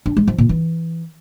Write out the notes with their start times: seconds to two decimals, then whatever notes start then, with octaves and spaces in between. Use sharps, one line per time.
0.06 D4
0.17 G#3
0.27 F3
0.38 A#2
0.49 E3